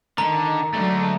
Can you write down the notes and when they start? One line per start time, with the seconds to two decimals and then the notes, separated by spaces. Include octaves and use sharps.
0.18 D3 D#3 A#5
0.73 D2 D3 F#3 G#3 A3